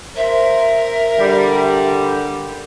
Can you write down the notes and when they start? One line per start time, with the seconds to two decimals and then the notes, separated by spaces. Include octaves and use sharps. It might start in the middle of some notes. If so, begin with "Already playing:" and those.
0.16 A#4 C5 E5
1.18 D3 G3